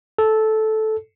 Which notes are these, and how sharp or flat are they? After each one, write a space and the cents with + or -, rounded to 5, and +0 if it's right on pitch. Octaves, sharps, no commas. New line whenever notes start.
A4 -10